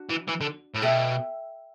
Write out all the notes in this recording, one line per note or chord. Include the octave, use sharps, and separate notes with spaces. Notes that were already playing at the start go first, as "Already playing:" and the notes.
Already playing: D4 F#4
E3
E3
D3
A2
B2 A4 E5 G5